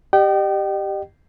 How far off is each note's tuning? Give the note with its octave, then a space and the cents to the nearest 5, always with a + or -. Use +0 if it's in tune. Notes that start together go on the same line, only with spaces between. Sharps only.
G4 +0 D#5 -45 G5 -30